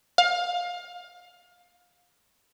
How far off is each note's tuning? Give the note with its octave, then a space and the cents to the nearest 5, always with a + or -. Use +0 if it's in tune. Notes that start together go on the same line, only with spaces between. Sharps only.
F5 +25